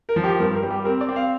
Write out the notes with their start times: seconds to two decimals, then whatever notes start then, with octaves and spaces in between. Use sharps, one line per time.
0.09 A#4
0.16 F3
0.24 G4
0.40 G2 A#4
0.55 A#4
0.63 G3
0.71 G4
0.85 C4 A#4
1.01 D5
1.09 C4
1.16 F5